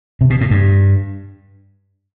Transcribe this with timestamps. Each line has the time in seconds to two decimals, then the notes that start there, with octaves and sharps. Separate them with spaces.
0.21 C3
0.30 B2
0.41 A2
0.51 G2